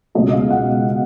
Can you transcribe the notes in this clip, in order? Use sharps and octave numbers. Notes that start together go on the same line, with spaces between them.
C#2 B2 F#3 D#5
F5
F#5